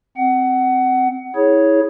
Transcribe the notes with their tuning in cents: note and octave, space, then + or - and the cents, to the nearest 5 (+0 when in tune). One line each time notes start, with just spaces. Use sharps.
C4 +0 F#5 +20
E4 -30 G#4 +0 C#5 +0